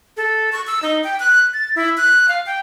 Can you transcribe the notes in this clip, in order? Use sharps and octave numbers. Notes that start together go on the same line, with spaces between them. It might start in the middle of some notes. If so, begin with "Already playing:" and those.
A4
C#6
E6
D#4
G5
F#6
A6
E4
F#6
F5
G5